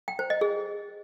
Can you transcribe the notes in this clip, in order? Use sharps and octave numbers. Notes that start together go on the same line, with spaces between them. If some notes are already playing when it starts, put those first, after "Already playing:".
G5
C5
D#5
G#4